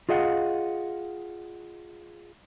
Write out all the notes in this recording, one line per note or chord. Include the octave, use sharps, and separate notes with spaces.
F4 G#4 D#5 F5 F#5